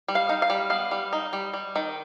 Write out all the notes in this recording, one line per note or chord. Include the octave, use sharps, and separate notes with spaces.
G3
F5
D#4
F5
G3
B3 F5
G3
D#4
G3
G3
D#3